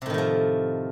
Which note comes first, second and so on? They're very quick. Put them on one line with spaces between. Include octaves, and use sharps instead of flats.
C3 A2 D#3 A3 F3